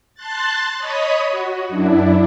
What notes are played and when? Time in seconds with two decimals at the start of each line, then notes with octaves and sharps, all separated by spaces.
0.15 A5 C6 F#6 A6
0.78 C#5 D#5 B5 D#6
1.29 F#4
1.69 F#2 D4 E4